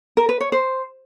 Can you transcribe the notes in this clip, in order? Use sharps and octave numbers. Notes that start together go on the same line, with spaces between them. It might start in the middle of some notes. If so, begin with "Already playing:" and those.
A#4
B4
C#5
C5